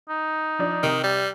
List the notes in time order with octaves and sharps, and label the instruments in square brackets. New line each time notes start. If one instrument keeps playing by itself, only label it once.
[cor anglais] D#4
[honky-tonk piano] F3 D4
[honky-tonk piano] C3 [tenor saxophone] D#3
[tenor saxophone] G3